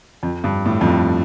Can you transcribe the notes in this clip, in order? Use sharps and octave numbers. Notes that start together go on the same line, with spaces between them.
F2
G2
A2
F2
G2